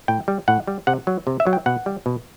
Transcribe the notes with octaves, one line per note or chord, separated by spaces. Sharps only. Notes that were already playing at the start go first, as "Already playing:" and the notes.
A2 G5
G3
A2 F#5
G3
C3 F#5
F#3
C3
E5
F#3
G5
B2 F#5
G3
B2